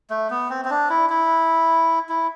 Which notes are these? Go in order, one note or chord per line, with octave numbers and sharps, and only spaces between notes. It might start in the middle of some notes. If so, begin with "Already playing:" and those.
A3
B3
C4
C4
D4
E4
E4
E4